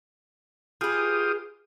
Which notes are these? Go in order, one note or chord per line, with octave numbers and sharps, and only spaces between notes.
F4 G4 G#4 B4 D#6